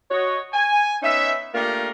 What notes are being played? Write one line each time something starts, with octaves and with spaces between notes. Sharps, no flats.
F#4 C#5 D#5
G#5
B3 C#4 D#4 E5
A3 A#3 D4 F4 G4 A#4